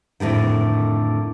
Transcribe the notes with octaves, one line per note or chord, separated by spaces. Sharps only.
F2 A2 D3 D#3